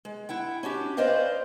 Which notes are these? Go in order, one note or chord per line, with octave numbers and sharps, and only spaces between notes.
G#3
E4 F#5 G5
C#4 D4 F#4 G4
B4 C5 D5 D#5 F5 G5